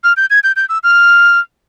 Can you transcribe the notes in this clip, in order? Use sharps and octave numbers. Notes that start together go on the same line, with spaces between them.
F6
G6
G#6
G6
G6
E6
F6